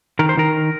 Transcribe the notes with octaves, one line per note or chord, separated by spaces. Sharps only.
D#3 A#4
C5
D#3 A#4